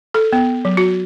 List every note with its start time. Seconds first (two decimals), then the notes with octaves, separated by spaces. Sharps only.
0.14 A4
0.33 B3
0.65 F#3
0.77 F#4